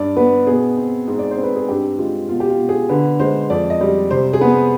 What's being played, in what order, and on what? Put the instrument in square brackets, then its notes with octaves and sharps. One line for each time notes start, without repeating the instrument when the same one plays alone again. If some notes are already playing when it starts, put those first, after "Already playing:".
Already playing: [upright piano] G2 D5
B3 B4
B2 G#4
C4
G#2
D5
C5
C4
B4
G#4
G2 G4
G#3 F4
B2 F4
G4
F4
B2
G#4
D3 B4
G#3 C5
F2 D5
D#5
G3
C3 C5
G#4
B3 B4